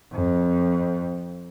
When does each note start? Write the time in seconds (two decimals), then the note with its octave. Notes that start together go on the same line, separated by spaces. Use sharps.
0.13 F2